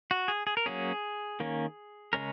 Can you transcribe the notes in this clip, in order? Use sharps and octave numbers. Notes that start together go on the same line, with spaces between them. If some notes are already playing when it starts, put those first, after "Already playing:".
F#4
G#4
G#4
A#4
F#3 A#3 C#4 G#4
D#3 A#3 C#4
C#3 G#3 C#4 A#4